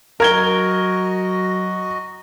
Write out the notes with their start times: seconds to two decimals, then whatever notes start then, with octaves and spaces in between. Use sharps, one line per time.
0.20 F#3 F#4 A#4 D#5 A#5 G#6 G7